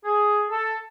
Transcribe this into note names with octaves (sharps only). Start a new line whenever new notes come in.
G#4
A4